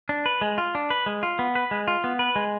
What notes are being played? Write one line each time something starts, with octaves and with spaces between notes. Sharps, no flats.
D4
B4
G#3
F4
D4
B4
G#3
F4
B3
B4
G#3
F4
B3
B4
G#3